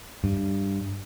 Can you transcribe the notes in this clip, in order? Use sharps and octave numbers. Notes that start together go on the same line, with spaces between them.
G2